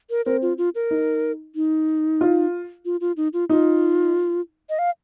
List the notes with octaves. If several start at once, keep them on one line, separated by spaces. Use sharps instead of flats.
A#4
C4 A#4
F4
F4
A#4
D#4
D#4
F4
F4
F4
D#4
F4
D#4 F4
D#5
F5